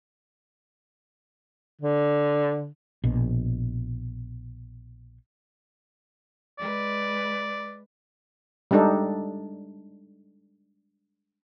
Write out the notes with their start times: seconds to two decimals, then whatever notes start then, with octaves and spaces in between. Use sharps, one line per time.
1.81 D3
3.04 A#1 B2
6.59 G#3 B4 D5
8.71 G3 G#3 D4 D#4 A4